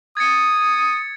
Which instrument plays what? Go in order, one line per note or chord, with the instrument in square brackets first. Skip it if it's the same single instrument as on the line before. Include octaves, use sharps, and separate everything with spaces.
[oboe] D#6 [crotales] G#6 A6 C#7